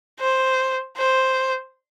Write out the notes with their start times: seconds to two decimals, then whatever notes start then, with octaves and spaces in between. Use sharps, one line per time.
0.20 C5
0.97 C5